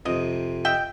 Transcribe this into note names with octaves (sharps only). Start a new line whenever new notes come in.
F2 C3 D#5
D#5 E5 G5